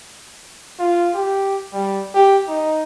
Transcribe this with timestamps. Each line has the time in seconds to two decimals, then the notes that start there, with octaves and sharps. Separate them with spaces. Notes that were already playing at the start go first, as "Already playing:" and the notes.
0.80 F4
1.14 G4
1.73 G3
2.15 G4
2.48 D#4